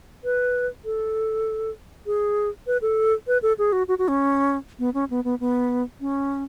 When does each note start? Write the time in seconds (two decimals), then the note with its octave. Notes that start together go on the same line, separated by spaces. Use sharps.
0.24 B4
0.85 A4
2.06 G#4
2.67 B4
2.82 A4
3.27 B4
3.42 A4
3.58 G#4
3.72 F#4
3.88 F#4
3.99 F#4
4.08 C#4
4.79 B3
4.94 C#4
5.10 B3
5.24 B3
5.40 B3
6.01 C#4